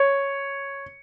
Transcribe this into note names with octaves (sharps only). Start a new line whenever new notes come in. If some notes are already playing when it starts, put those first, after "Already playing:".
Already playing: C#5